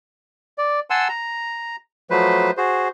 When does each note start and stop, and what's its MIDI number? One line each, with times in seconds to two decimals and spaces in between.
0.58 0.80 74
0.90 1.08 78
0.90 1.08 80
0.90 1.08 81
0.90 1.08 84
0.90 1.08 88
1.09 1.76 82
2.10 2.51 53
2.10 2.51 54
2.10 2.51 57
2.10 2.51 71
2.10 2.51 72
2.57 2.88 66
2.57 2.88 68
2.57 2.88 72